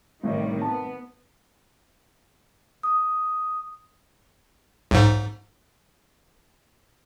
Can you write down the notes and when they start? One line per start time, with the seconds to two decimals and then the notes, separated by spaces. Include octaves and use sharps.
0.23 A1 A2 C3 D#3 G3 D#5
0.61 B3 A5
2.83 D#6
4.91 B1 G#2